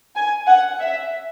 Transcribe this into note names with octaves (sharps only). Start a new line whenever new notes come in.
G#5
F#5
E5